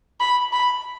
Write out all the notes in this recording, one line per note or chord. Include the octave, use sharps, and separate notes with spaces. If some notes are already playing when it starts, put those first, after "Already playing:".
B5
B5